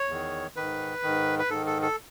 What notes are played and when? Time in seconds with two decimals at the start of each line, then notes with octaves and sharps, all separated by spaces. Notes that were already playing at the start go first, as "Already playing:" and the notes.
Already playing: C#5
0.09 E2 D#3
0.56 G#2 D#3 B4
1.03 G#2 D#3
1.39 B4
1.50 G#2 D#3 A4
1.66 A4
1.82 A4